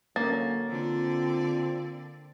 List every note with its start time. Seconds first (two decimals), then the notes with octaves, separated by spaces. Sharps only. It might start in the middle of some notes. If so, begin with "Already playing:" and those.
0.16 D3 F#3 A#3 C#4 A6
0.70 D3 C4 F4 D5